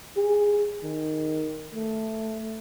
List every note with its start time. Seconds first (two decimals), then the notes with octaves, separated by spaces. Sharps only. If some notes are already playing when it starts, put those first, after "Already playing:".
0.17 G#4
0.83 D#3
1.73 A3